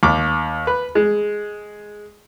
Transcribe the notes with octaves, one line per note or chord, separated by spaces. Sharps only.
D#2 D6
B4
G#3